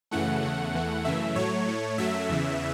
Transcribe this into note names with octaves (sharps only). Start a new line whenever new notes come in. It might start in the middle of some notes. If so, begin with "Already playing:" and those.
F#2 C#3 E3 A3 F#5
E2 C#3 A3
E2 E3 A3
F#2 C#3 E3 A3 E5
A2 F#3 A3 C#5
A2 A3
F#2 F#3 A3 E5
E2 C#3 E3